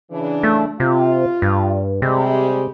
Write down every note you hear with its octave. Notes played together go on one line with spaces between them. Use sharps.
C#3 E3 D4
A3
C3 F4
G2
C3 G3 G#3 G4